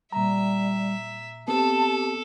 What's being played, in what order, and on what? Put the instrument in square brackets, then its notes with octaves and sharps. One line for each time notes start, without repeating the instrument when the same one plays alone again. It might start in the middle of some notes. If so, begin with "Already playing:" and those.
[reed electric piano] A#2 A#5 [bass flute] G3 [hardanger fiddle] E5
[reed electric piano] B3 C4 [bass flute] G4 [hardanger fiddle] A4 [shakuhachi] A5